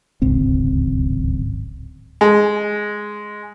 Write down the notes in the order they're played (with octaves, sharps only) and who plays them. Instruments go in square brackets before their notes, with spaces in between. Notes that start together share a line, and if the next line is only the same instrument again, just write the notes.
[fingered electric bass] D1 G#1 C#2 C4
[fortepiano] G#3